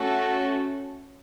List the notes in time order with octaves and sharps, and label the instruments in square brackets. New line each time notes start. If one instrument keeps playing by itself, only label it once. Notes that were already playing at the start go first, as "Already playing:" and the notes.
Already playing: [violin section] A3 C#4 F#4 A4